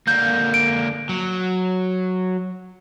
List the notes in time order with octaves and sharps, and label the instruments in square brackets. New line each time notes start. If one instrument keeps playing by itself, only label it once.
[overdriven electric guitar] D3 A#3 [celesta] G6
[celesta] D7
[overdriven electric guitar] F#3